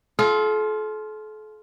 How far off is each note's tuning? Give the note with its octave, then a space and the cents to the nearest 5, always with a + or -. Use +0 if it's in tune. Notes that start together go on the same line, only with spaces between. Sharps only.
F4 +0 A4 -40